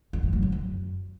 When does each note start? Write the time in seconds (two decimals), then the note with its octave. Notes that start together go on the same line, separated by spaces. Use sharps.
0.13 D#3
0.23 G2
0.33 F#3
0.43 D3
0.52 F#2